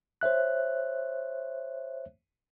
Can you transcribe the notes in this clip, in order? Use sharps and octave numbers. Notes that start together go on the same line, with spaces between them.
C5 C#5 E5 F#6